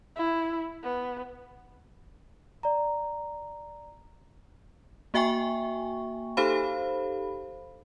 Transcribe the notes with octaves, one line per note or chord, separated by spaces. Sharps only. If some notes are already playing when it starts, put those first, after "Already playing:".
E4
B3
D5 A#5
A#3 F#4 E5 G5 G#5 C#6
D#4 G4 A4 C5 F5 B5